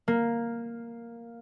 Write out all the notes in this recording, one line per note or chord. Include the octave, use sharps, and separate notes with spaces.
A#3